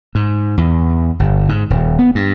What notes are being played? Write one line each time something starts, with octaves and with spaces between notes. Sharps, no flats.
G#2
E2
G1
G#2
D#1
B3
G2